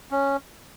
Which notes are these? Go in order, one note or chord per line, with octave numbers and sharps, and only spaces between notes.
C#4